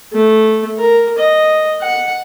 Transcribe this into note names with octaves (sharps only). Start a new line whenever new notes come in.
A3
A#4
D#5
F#5